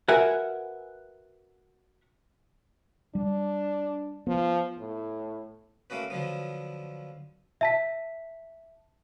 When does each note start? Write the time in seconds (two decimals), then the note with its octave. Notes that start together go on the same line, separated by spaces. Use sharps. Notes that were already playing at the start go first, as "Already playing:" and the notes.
0.08 F#4 A#4 B4 E5 F#5 G#5
3.15 G3 D4
4.27 F3 B3
4.78 A2
5.90 A3 A#3 C#4 F#4 B4
6.10 D3 F3 F#3 B3
7.61 E5 A5 B6